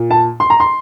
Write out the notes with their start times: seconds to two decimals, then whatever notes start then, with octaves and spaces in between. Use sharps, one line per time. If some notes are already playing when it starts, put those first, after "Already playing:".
Already playing: A#2
0.11 A5
0.40 C6
0.50 A#5
0.60 C6